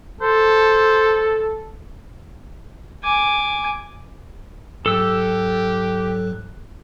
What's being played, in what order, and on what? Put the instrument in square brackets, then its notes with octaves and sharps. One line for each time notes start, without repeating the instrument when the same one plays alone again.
[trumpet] A4 [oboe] C5
[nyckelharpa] G#5 D6
[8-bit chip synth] G#2 F#3 F#6 [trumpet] G4 [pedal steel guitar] A4 E6